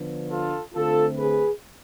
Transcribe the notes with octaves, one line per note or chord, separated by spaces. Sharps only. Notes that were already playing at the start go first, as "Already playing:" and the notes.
Already playing: D3 F3 B3 D4
F4 A4
D3 A3 C4 F4 A4
G#4 B4